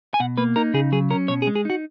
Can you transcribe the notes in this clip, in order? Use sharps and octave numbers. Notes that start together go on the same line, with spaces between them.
G#5
B2 F#5
A#3 B4
D#4 A#4
C#3 G#4
F#3 G#4
C#4 A#4
B2 C#5
G#4
G#3
G#4
D#4 F#4